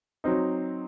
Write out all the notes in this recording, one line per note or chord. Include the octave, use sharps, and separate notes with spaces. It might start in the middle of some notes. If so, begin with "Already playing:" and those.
F#3 C4 D#4